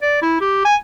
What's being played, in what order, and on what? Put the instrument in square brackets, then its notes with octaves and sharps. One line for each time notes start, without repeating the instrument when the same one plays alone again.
[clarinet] D5
E4
G4
G#5